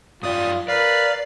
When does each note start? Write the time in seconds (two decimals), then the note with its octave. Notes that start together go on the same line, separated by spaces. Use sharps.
0.23 F#2 F4 D5 G5 D#6
0.68 A#4 B4 D5 F5